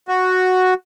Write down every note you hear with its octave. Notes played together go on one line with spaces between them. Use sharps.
F#4